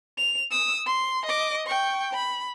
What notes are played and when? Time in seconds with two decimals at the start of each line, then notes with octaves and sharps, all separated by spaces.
0.18 F7
0.51 D#6 E6
0.86 C6
1.25 D#5 D6
1.67 G5 C#6
2.13 B5